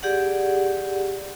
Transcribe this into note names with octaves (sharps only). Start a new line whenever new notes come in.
G4 G#4 D5 F#5